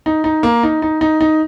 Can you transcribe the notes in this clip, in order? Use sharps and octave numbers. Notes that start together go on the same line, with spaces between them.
D#4
D#4
A#3
D#4
D#4
D#4
D#4